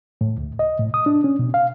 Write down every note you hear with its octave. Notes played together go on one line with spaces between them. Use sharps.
A2
D2
D#5
A2
D#6
D4
C#4
B2
F5